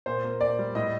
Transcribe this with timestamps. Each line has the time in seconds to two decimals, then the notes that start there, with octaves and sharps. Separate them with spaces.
0.06 A#2 C5
0.24 A#3
0.41 A#2 D5
0.59 G3
0.75 A2 D#5